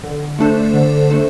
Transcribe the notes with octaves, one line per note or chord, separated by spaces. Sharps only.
D3
A3 D4 A4 C5
D3
A3 D4 A4 C5